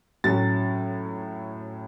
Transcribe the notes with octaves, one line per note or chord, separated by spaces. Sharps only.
A2 F#3 C#4 A6